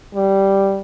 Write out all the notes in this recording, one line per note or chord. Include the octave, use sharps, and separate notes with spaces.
G3